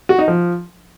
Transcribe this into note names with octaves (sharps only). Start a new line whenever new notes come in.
F#4
D#4
F3